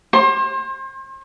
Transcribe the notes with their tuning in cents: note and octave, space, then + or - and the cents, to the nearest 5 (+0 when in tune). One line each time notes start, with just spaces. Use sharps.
C5 +40 C6 +30